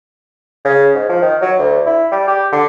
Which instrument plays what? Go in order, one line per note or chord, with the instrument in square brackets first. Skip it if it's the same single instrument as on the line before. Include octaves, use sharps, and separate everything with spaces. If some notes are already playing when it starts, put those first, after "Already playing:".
[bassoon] C#3
G#2
F3
D#3
F#3
D2
E4
G3
G4
D3